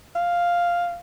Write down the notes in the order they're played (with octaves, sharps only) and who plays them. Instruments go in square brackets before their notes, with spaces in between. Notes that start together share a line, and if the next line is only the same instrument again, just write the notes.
[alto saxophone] F5